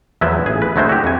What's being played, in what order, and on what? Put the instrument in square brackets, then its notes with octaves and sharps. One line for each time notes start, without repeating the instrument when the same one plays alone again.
[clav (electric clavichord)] E2 F3 F#3 E4 B4 E5
A1 G#4
B4
D2 F#3 G#3 A3 E4 C5
F#4 G4
F2 G#5